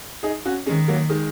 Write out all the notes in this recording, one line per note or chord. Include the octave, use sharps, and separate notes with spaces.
D#4 G#4
C#4 F#4
D#3 G#3 C#4
F#3 A#3
D#3 G#3